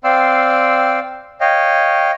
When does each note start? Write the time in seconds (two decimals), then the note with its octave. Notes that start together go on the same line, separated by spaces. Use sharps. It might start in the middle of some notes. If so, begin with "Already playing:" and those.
0.04 C4 D5 F5 G5 C6 E6
1.41 C#5 D#5 F5 G5